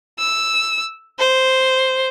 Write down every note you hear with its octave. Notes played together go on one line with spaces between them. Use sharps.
E6
C5